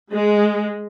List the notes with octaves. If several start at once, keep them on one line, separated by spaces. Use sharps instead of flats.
G#3